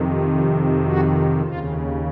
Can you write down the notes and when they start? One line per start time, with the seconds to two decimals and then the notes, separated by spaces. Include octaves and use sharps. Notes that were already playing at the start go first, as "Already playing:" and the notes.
Already playing: F2 C3 D#3
0.83 F#4
1.41 D#2 C#3 F4